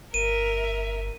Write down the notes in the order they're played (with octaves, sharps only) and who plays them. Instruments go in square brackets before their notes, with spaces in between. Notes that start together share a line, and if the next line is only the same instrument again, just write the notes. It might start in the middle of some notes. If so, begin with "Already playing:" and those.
[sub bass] G1 [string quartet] A#4 E5 [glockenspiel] D#7